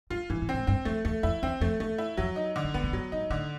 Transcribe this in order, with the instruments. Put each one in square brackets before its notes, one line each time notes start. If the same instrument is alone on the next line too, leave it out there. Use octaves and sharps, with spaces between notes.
[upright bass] G2 [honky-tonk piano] F4
[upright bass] G#2 [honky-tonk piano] E3
[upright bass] A2
[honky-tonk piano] C4
[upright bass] G#2
[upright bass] G2 [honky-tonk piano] C4
[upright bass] F2 [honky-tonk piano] A3
[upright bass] E2 [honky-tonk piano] A3
[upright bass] F2 [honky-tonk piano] E4
[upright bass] E2 [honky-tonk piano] C4
[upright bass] F2 [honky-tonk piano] A3
[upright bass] E2 [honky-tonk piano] A3
[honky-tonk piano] E4
[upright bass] F2 [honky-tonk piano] F#3
[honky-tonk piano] D#4
D3
[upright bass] G#2
[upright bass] A2 [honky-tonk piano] B3
[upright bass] A#2
[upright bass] G2 [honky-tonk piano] F#3
[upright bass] G#2 [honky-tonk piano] D#4
[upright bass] A2 [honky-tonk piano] D3